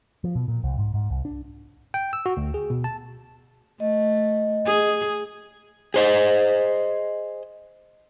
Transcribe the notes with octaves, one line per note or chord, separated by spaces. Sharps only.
F3
B2
A#2
C2
G#2
G#2
C2
D4
G5
E6
F#4
D2
G#4
B2
A5
A3 D#5
G#4
G#4 C5 D#5